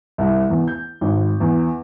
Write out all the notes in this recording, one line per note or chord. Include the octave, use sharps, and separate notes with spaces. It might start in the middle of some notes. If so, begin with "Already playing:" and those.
C2
E2
G6
G#1
E2